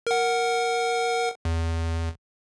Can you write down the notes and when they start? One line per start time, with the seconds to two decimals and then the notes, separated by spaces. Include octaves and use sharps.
0.07 A#4 F#5
1.45 E2